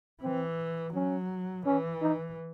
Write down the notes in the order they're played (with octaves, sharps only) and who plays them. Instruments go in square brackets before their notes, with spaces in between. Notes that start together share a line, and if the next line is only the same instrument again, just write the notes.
[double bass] E3 [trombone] C4
[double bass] F#3 [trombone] C#4
[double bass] E3 [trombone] C#4
[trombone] D#4